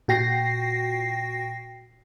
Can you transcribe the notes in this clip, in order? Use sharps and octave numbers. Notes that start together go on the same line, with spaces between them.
A#2 F#4 G5 A#6 C7